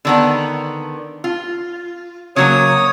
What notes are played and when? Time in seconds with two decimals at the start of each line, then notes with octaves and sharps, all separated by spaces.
0.05 D3 D#3 B3
1.24 F4
2.36 C#3 F#3 A#3 C#5 D#6